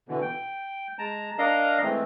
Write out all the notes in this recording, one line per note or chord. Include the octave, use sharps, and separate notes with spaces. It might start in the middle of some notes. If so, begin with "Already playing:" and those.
B2 D3 E3
G5
G#3 A5 A#5
D4 A#4 D#5 F5 A#5
E3 G#3 A3 C4